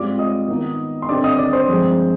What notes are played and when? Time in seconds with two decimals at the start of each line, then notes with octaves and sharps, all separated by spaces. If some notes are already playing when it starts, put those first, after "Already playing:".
Already playing: G#2 G3 C4 F4 D5 D6
0.19 D#5 D#6
0.48 D#3 B3 D#4
1.02 C6
1.09 D3 G3 C4 D#4 D5 D6
1.24 D#5 D#6
1.38 D5 D6
1.53 C5 C6
1.68 G2 F3 G#3 C4 D#4